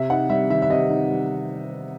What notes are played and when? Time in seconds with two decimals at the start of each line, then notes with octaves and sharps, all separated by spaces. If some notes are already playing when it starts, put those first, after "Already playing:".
Already playing: C3 E5
0.10 D#4 F#5
0.30 G3 E5
0.50 D#3 E5
0.62 E5
0.70 C3 D#5
0.90 D#4
1.10 G3